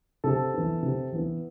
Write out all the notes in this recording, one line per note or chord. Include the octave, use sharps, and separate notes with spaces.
C3 A4
E3 B3
C3
E3 B3